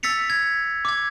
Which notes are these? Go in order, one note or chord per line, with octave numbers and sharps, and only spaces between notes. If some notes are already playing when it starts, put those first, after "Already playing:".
E6 A6 B6 C#7 F7
G#6
D6 G#6